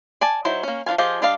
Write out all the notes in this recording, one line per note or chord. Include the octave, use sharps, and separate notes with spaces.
D5 G#5 A5
F#3 D#4 E4 C5
A#3 C#4
F3 D4 F4 F5 G#5
F3 F4 G4 G#4 D#5
G3 D4 D5 D#5 F5